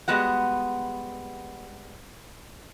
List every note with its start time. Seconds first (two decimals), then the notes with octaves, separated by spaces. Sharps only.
0.08 G3 G#3 B3 F#4 F#5